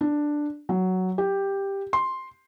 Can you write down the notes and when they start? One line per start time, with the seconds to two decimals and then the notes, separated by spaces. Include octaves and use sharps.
0.01 D4
0.69 F#3
1.18 G4
1.93 C6